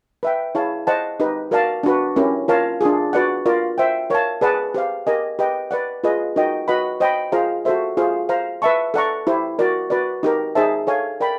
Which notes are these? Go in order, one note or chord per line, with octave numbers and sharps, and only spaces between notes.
B4 E5 G5
E4 G#4 C#5 F5 A5
C5 D#5 F#5 A5
D#4 G4 B4
F#4 A#4 D5 F5 A5
D4 F#4 B4
C#4 E4 G4 A#4
F4 A#4 C#5 F5 A5
D4 F4 G#4
F#4 B4 D5 F#5
F4 A#4 D5
C5 E5 G5
A#4 C#5 F5 A5
G#4 B4 D5 F#5 A5
G4 C5 F5
G4 A#4 D#5 G#5
G4 B4 D#5 G5
B4 D5 F#5
F4 G#4 B4 D#5
D#4 F#4 A#4 D#5 G5
F#4 B4 D#5 F#5 B5
C5 D#5 G5 B5
F4 G#4 C5 F5 A#5
F#4 A4 C5 E5
F4 G#4 C5 F5
C5 F5 A#5
B4 E5 A5 C#6
A4 D5 F#5 A#5 C#6
E4 G4 C5
F#4 A#4 D5
F#4 B4 D5
D#4 G4 A#4
D#4 G#4 C5 E5 A5
A4 C#5 F5 G#5
A#4 D5 G5 B5